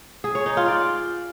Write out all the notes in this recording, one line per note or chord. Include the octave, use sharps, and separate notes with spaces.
G#4
C#5
D#4
F4
D5